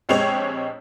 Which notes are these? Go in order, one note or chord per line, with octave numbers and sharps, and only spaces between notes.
A#1 G#3 C4 G4 C#5 F7